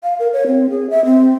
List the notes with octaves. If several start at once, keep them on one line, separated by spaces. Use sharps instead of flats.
F5
A#4
C#5
C4
G#4
E5
C4